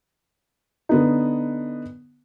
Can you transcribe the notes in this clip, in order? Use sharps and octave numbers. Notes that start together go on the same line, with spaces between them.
D3 B3 D#4